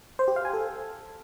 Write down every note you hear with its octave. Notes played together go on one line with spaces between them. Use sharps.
C5
G4
F5
G#5
A4